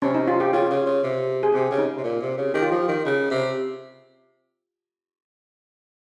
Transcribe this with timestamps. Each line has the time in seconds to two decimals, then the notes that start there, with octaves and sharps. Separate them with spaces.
0.02 C3 C#4
0.14 D#4
0.28 F4
0.40 G4
0.53 C#3 F4
0.70 C#3
0.86 C#3
1.03 C3
1.43 G#4
1.54 C3 G4
1.71 C#3
1.78 D#4
1.97 C3
2.03 A#2
2.21 C3
2.38 C#3
2.54 D#3 G4
2.62 F4
2.70 F3 G4
2.88 D#3
3.05 C#3
3.30 C3